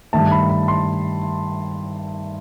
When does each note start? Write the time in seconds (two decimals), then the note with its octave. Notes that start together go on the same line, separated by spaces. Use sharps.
0.13 G2 D#3 A3 A5
0.31 B5
0.49 B5
0.68 C6